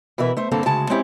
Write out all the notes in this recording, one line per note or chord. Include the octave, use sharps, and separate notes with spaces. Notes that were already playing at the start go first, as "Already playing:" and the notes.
B2 E3 A#4 B4 E5
A3 C5 E5
G2 D3 A#3 C4 A4
D2 C#3 G#3 A5
G#3 C4 C#4 E4 G4